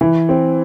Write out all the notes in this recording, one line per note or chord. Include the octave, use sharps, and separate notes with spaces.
E3
C4